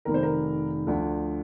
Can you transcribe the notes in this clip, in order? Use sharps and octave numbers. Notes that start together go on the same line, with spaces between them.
F1 F2 D#3 A#4
C5
A#4
D2 D3 F3